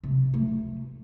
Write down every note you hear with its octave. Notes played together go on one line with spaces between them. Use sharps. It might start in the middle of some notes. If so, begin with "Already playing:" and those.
C3
A3